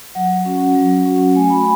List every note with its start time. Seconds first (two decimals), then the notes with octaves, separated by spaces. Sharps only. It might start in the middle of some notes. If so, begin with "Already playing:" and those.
0.15 F#3 F#5
0.45 C#4 F#4
0.75 F#3
1.05 C#4 F#4
1.35 A3 G#5
1.50 B5